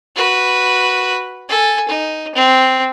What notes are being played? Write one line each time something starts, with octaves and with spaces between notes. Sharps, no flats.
F#4 B4
A4 G#5
D#4
C4